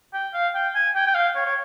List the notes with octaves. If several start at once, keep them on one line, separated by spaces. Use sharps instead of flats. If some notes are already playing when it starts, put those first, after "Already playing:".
G5
F5
G5
G#5
G5
G5
F5
C#5
C#5